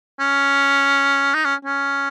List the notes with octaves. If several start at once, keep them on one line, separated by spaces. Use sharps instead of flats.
C#4
D#4
C#4
C#4